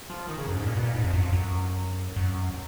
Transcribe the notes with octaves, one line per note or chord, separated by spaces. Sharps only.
F3
D#3
C#3
F#2
G#2
A#2
B2
A#2
G#2
F2
F#2
F2
F#2
F#2